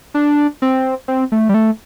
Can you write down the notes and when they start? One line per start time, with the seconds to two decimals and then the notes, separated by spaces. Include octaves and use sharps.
0.14 D4
0.62 C4
1.08 C4
1.32 A3
1.49 G3
1.54 A3